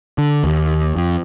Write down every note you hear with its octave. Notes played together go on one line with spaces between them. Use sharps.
D3
D#2
F2